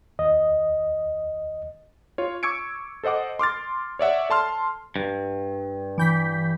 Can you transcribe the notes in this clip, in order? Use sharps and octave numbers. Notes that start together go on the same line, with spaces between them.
D#2 D#5
F4 C#5
C#6 D6 E6 G#6 C#7 D7
A4 C5 D#5 F#5 D6
C6 D6 F6 A6
C#5 D5 E5 F#5
A4 A5 C6 F6
G2
E3 G6 B6